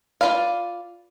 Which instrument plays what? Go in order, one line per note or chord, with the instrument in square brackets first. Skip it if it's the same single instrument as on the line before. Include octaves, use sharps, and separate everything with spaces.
[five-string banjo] F4 A4 B4 D5 F5